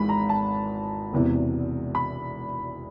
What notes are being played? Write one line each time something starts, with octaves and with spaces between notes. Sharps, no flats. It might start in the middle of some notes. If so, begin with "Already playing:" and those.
Already playing: G#1 G#2 E3 G#3 B5
A#5
A5
E1 E2 C3 E3
B5